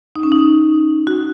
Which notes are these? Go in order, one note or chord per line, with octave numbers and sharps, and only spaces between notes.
D#4
C#4
D#4
F#4